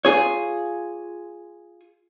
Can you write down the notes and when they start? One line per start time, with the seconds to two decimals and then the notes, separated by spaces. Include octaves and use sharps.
0.05 F4 G#4 C#5